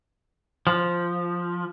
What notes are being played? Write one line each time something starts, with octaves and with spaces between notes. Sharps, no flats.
F3